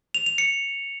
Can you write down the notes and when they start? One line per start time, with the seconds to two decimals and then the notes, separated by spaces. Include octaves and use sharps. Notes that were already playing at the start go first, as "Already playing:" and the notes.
0.14 F7
0.26 F7
0.38 C#7